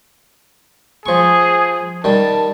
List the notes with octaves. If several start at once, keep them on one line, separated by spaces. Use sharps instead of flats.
F3 G#4 C#6
D#3 G3 A5